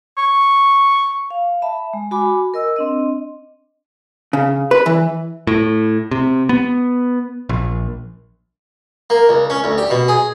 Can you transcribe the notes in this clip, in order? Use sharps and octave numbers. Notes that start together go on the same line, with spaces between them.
C#6
F5
E5 A5 B5
G#3
F#4 G#5 B5 D6
A#4 D#5 E6
C4 D4 D#5
C#3
B4
E3
A2
C3
B3
A#1
A#3
C#2
C#4
D2
G4
B2
G#4